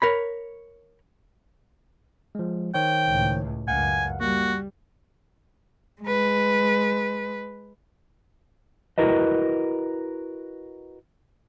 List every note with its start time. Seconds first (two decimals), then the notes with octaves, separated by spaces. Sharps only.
0.02 A#4 C#5 B5
2.35 F3 G#3
2.74 D#3 C5 C#5 G5
3.08 C#2 A2
3.68 C#2 F#2 F5 F#5 G#5
4.21 G3 A#3 F#4
6.02 G#3 B4
8.98 E4 F#4 A#4 B4 D#5